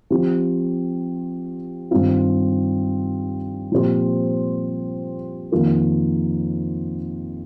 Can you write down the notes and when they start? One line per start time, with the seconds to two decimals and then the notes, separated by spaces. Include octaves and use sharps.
0.10 F3 C4 G4
1.91 G2 D#3 G3 C4 F4
3.71 A#2 F3 C4 G4 C5
5.52 F2 D#3 A#3 F4 A#4